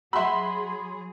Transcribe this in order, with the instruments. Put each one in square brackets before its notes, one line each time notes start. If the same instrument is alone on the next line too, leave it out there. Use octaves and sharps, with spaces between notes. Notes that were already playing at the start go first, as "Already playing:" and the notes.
[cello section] F#3 G#4 [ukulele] F#4 E5 [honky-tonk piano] B5 C6